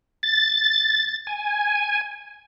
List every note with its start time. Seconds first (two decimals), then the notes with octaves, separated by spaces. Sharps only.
0.23 A6
1.27 G#5